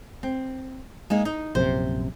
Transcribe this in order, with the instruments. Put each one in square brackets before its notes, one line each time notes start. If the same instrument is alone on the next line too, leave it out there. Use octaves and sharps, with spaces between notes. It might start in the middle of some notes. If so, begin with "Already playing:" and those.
[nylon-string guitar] C4
G#3 A#3 D#4
D#4
[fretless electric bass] A#1 F#2 C3 [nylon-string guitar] C5